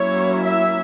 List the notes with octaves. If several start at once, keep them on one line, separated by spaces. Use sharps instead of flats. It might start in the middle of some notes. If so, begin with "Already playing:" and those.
Already playing: F#3 A#3 C#4 E4 C#5
E5